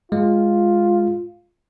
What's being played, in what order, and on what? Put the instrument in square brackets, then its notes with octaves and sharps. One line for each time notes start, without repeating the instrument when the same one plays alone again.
[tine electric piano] G#3 [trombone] F4